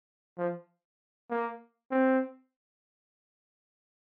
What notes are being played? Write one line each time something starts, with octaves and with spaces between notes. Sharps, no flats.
F3
A#3
C4